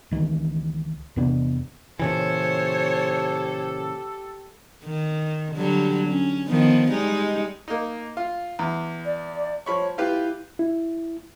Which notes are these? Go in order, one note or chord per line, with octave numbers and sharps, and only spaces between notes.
C#2 D#3 E3
E2 C3 B3 D4
A#2 C#3 E3 G4 A4 C5 C#5
D#3
D3 F#3 G3
C#4
D#3 F3 B3
G3 G#3 D#4
A#3 D#4
F4
E2
D5
F3 C#5 B5 C#6
E4 F4 G4 B4
E4